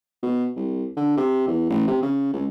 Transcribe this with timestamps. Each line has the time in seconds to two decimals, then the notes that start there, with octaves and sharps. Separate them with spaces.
0.23 B2
0.56 C2
0.96 D3
1.17 C3
1.47 E2
1.70 A1
1.88 C3
2.02 C#3
2.33 C#2